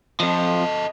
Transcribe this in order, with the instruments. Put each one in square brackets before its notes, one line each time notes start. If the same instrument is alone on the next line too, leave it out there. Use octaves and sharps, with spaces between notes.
[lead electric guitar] F2 F3 [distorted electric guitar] A4 D#5